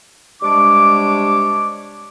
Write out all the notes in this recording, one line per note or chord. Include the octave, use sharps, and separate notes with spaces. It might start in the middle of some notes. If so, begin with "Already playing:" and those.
C3 G3 G#3 D4 C#5 D6